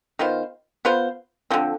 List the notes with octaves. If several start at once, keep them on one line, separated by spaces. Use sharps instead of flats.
D#3 B3 F4 C5
B3 F4 C5
D3 F3 C4